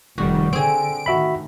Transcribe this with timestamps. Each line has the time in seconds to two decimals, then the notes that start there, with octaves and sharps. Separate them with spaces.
0.18 F1 D#3 G3 F#4
0.53 D3 C4 G#4 D7
1.06 A2 D#3 F#4 E5 B5